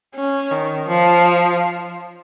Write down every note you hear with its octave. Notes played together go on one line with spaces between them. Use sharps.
C#4
D#3
F3